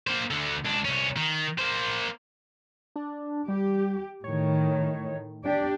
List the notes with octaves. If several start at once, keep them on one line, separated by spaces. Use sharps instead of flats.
A#3 C5
D2 D3
C#2 D4
C2 C#4
D#3
A#3 C5
D4
G3 G4
A2 D#3 C#5
D4 G4